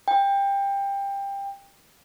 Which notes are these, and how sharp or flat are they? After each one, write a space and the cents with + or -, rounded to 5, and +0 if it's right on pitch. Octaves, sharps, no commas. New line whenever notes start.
G5 +20